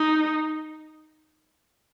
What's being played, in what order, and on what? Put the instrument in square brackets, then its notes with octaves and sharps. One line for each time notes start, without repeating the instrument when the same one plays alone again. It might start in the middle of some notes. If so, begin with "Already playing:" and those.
Already playing: [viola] D#4